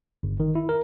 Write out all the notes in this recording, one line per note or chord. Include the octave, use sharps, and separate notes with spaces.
G1
D#3
E4
A#4